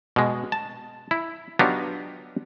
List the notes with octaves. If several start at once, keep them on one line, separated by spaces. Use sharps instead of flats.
B2 G#3
A5
E4
F#3 B3 D4 D#4 F4 G4